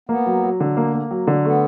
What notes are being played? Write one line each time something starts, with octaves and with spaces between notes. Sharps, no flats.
A#3 B3
F#3
F#3
D3
A#3
A#3
F#3
D3
A3 B3